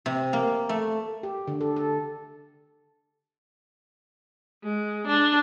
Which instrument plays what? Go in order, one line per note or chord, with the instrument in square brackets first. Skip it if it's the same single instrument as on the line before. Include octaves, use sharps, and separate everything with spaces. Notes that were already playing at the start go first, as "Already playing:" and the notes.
[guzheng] C3
A#3
A3
[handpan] G4
D3
A4
A4
[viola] G#3
D4